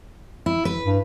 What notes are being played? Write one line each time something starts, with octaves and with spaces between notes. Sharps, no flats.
E4
B4
G2